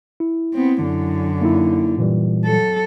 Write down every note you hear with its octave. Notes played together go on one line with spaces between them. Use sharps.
E4
B3 C4
F#2 D3
A#3 D#4 E4
A#2 E3 G3
F#3 A4